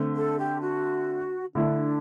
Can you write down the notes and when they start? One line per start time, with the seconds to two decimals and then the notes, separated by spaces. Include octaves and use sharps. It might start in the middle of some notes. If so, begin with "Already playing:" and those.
Already playing: D3 A3 C4
0.15 A4
0.38 G4
0.61 F#4
1.55 D3 A3 D4 E4